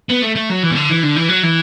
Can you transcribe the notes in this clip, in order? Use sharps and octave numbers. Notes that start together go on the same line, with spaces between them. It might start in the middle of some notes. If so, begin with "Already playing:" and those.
B3
A3
A3
F#3
E3
B2
D3
E3
D3
E3
F#3
E3